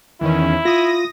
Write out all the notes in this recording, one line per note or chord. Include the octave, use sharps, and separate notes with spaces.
E2 D#3 C#4 E4
F4 D#6 A#6